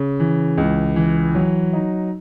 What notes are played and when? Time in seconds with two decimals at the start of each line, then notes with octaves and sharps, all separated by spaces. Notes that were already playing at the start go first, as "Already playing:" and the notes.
Already playing: C#3
0.20 E3
0.58 C#2
0.96 E3
1.35 F#3
1.73 D#4